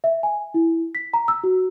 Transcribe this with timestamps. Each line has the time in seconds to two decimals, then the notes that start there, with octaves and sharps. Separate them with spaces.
0.04 E5
0.23 G#5
0.54 E4
0.95 B6
1.13 A#5
1.28 E6
1.44 F#4